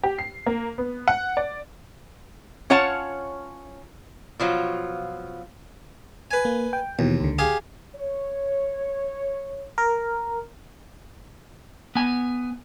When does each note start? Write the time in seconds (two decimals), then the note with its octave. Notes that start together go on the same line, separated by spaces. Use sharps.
0.04 G4
0.19 C7
0.46 A#3
0.78 B3
1.08 F#5
1.37 D5
2.70 C#4 F4 C#5 F#5 A5
4.40 B2 F3 F#3 F4
6.31 B4 G#5
6.45 A#3
6.73 G5
6.99 D#2 B2 E3
7.20 C#2 D3
7.39 G4 G#4 F5
7.95 C#5
9.78 A#4
11.95 B3 G#5